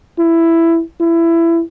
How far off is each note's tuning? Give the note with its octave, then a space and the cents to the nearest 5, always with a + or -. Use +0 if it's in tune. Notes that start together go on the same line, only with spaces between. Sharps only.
E4 +10
E4 +20